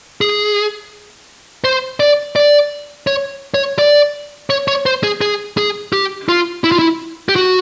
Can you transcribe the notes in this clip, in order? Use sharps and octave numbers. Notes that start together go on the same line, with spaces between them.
G#4
C5
D5
D5
C#5
C#5
D5
C#5
C#5
C5
G#4
G#4
G#4
G4
F4
E4
F4
E4
G4
F#4